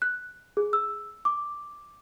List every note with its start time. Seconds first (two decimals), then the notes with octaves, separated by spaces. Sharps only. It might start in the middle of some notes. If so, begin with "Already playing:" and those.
0.02 F#6
0.57 G#4
0.73 E6
1.25 D6